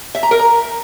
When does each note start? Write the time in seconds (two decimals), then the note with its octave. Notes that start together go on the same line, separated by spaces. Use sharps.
0.15 E5
0.23 A#5
0.31 A#4
0.39 A#5